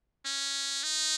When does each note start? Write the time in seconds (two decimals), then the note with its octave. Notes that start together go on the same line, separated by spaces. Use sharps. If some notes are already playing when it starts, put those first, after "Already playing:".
0.25 C#4
0.83 D#4